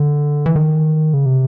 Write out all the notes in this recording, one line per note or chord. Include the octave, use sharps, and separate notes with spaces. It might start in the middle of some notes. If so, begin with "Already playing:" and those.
Already playing: D3
E3
D#3
C#3
C3